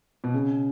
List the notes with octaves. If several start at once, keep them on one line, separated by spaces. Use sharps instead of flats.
B2
C#3